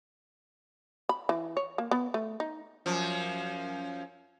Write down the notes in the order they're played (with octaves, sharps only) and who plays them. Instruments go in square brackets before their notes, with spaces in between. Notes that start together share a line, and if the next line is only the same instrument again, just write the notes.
[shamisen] B5
E3
C#5
A#3
B3
A3
D#4
[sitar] F#2 F3